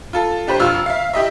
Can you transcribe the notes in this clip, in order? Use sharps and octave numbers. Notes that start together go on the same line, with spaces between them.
F4 A4
D4 G4 B4 C5
F1 F4 E6 F6
E5 F5
E4 G4 D#5 E5